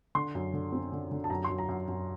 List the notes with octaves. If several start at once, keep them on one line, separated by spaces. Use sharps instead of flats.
D3 C6
F#2
D3
C4
D3
D3
A5
F#2 A#5
F#2 C6
A#5
F#2
F#2